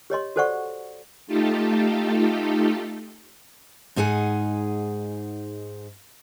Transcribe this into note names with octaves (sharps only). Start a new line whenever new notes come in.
G4 C#5 D#5 C6
F#4 A4 C5 D5 F#5 C#6
A3 D#4 F4 G4 A4
G#2 D#4 G#4 F#5 G#5